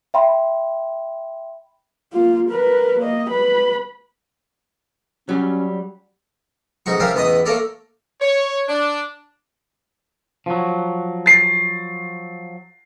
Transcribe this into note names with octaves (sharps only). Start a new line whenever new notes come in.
E5 G5 B5 C6
A#3 F4
A#4 B4
A#3 D#5
B4 B5
F#3 G3 C#4
A1 G#2 D#4 F#4 C#6
F3 C#4 G4 A#4 C5 E5
A1 E2 B3 B4 D#5 D#6
A3 A#3 A4 A#4 C#5 D5
C#5
D4
F3 F#3
A6 C7